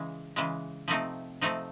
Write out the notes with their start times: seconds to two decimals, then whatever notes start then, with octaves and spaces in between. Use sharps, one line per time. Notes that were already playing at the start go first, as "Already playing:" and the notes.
Already playing: C#3 E3 G#3
0.36 C#3 E3 G#3
0.88 C3 F3 A3 C4 D#4
1.41 C3 F3 A3 C4 D#4